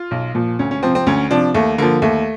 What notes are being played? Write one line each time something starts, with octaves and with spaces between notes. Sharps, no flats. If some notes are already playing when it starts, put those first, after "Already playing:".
Already playing: F4
B1
A#2 F3
D2 C#4
C#4
C3 F3 C4
C4
D2 C#4
C3 F3 D4
D#2 A3
D3 F3 A#3
D#2 A3